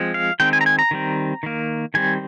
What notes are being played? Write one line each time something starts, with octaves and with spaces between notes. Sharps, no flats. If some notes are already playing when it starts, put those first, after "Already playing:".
Already playing: F3 G#3 C4
F5
D#3 G#3 C4 G5
G#5
A#5
G#5
A#5
D#3 G3 C4
D#3 A#3
D#3 G3 C4 G#5